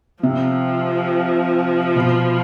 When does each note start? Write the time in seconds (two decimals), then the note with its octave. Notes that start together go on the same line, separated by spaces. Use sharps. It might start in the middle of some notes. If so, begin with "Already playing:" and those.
0.23 C3 F3
1.96 B2